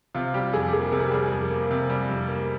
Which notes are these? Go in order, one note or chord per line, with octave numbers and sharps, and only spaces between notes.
C3 F4
G3 G4
F2 G#4
G4
A#3 G#4
C3 A#4
G#4
G4
G3 G#4
F2
A#3
C3
G3
F2
A#3